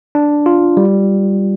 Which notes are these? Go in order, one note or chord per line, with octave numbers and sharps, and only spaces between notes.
D4
F4
G3